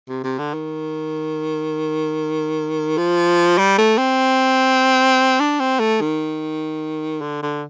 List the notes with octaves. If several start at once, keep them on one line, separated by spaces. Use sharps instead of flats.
C3
C3
D3
D#3
F3
G3
A3
C4
D4
C4
A3
D#3
D3
D3